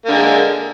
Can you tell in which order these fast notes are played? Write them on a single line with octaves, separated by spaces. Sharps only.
A#3 D3 G#3